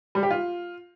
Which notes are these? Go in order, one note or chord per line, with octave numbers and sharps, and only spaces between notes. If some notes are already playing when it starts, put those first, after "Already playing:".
G3
G4
F4